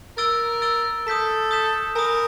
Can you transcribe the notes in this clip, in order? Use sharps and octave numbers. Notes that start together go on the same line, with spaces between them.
A#4 E6 A6 D7 G7
E6 A6 D7 G7
A4 D#6 G6 B6 E7
D#6 G6 B6 E7
A#4 G#5 B5 D#6